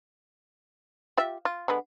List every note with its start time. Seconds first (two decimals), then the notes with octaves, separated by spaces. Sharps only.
1.17 F4 G4 E5
1.45 F4
1.68 D3 G#3 B3